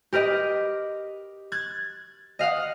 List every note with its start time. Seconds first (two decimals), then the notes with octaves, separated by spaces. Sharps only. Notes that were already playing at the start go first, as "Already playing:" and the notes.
0.12 G4 A#4 B4 D#5
1.52 F#6 G#6 A6
2.39 D#5 F5 F#5 D#6